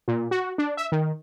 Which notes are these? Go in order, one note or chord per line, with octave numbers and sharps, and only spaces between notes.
A#2
F#4
D4
E5
D#3